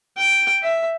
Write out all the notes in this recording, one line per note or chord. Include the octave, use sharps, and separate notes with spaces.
G5
E5